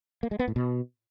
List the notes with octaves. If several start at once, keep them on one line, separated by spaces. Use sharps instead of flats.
A#3
G#3
B3
A2
B2